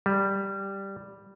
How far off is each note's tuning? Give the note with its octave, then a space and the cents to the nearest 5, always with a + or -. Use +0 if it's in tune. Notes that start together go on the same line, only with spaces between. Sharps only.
G3 +0